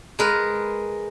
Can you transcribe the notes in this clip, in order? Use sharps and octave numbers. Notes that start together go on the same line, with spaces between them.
G#3 A#4 B4